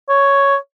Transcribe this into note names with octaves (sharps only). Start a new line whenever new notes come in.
C#5